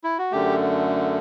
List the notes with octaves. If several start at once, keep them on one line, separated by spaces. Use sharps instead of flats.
E4
F#4
F#2 D3 A3 G4